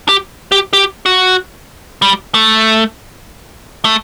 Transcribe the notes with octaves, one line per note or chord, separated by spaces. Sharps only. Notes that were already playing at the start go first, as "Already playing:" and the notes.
G4
G4
G4
F#4
G3
A3
A3